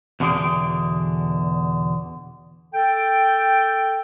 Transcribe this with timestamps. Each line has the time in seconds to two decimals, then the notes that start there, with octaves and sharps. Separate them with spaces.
0.20 E2 B2 D3 F#3 G#4 G5
2.73 A4 G5